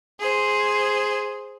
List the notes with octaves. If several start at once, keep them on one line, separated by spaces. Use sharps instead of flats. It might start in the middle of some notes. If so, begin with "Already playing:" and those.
G#4 C5